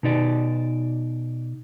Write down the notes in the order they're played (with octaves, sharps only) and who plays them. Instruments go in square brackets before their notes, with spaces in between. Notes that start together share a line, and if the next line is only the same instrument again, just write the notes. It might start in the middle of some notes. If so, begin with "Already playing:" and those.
[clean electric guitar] B2 D#4 D5